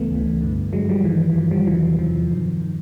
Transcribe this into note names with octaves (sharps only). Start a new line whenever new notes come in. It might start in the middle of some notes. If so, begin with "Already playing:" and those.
Already playing: C#2 C#3 E3 A3 B3
C#2 C#3 E3
G2 D3
G2 D3 F#3 G#3
F3 G3
G2 D#3 E3
E3
G2 D#3 F3
F3 G3
E2 C3 D#3 E3 F#3
E2 C3 D#3 F3
G2 D#3
D#3